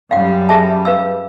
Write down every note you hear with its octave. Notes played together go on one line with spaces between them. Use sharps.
F#2 G3 F5 F#5
G#4 E5 A5
B4 F5 E6